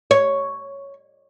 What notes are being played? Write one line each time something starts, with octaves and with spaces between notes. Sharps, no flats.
C#5